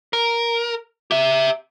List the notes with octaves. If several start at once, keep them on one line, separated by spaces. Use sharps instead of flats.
A#4
G4 E5